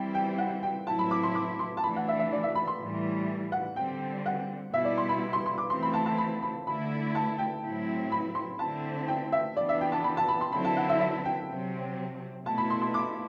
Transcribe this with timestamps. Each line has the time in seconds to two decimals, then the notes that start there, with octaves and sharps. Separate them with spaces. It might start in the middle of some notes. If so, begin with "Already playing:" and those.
Already playing: E3 G3 C4 E4 G5
0.14 G5
0.38 F#5
0.63 G5
0.87 A2 F#3 C4 E4 A5
0.99 B5
1.11 D6
1.23 C6
1.35 D6
1.59 C6
1.77 A5
1.84 E3 A3 D4 B5
1.96 F#5
2.08 E5
2.19 E5
2.33 D5
2.43 E5
2.55 B5
2.68 C6
2.80 A2 E3 G3
3.52 F#5
3.76 D3 G3 C4 G5
4.26 F#5
4.73 B2 G3 B3 E4 E5
4.85 D5
4.98 C6
5.09 B5
5.33 C6
5.46 C6
5.58 D6
5.69 E3 A3 C4 E4 C6
5.83 B5
5.93 A5
6.06 A5
6.18 B5
6.43 B5
6.67 D3 A3 E4 B5
7.15 A5
7.38 G5
7.64 A2 F#3 C4 E4
8.12 B5
8.35 C6
8.59 D3 A3 C4 E4 A5
9.08 G5
9.32 E5
9.57 E3 B3 D4 D5
9.69 E5
9.81 G5
9.92 A5
10.04 B5
10.17 A5
10.28 B5
10.41 C6
10.52 D3 F#3 C4 E4 B5
10.64 A5
10.77 F#5
10.89 E5
11.01 E5
11.25 G5
11.49 C3 F#3 C4
12.45 B2 A3 E4 A5
12.58 B5
12.70 C6
12.82 C6
12.94 D6